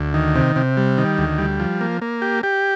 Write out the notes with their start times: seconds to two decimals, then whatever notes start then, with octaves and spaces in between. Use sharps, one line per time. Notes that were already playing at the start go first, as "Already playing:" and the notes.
Already playing: D2
0.14 D#3
0.36 C3
0.56 C3
0.77 G3
0.98 D#3
1.18 D2
1.38 G3
1.60 F3
1.81 A#3
2.02 A#3
2.22 G4
2.43 G4